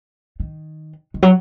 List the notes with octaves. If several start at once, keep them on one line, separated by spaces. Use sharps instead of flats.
D#3
D#3
F#3